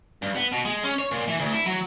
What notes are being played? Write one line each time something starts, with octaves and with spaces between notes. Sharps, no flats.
G2
B3
B2
G#3
C#4
C#5
A#2
E3
D2
E4
F#3